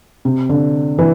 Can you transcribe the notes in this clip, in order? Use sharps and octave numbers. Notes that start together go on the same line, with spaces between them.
C3
D3
E3